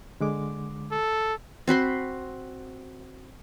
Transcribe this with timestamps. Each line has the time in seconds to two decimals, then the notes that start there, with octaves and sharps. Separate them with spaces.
0.20 D3 G#3 D6
0.92 A4
1.67 C4 F#4 B5 C6